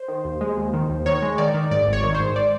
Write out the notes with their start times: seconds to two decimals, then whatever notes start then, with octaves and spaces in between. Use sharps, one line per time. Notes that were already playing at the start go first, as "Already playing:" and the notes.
Already playing: C5
0.08 D#3
0.25 D#2
0.41 G#3
0.57 D#2
0.73 D#3
0.90 D#2
1.06 D#3 C#5
1.22 G#3
1.38 D#3 D5
1.54 D#3
1.71 G#2 D5
1.87 G#1
1.93 C#5
2.03 D#3
2.14 C5
2.20 G#2
2.36 D5